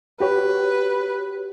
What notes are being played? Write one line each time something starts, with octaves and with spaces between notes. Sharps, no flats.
F#4 G4 B4 C#5